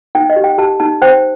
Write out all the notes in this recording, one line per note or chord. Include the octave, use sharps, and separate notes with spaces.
D#4 G5
D#5
G4
G5
G4 A5
D#4 A5
C5 G5